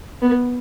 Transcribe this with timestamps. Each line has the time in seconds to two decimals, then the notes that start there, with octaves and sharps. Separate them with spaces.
0.22 B3